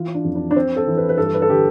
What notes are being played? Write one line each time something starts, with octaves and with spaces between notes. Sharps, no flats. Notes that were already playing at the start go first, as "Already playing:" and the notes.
Already playing: E3 F4
D4
F2
D4
D4
F2 C4
A4
E3
B4
B4
G2 A4
B4
A4
D3 G4